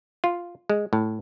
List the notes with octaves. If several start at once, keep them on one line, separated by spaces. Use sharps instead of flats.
F4
G#3
A2